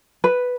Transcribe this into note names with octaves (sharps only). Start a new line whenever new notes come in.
B4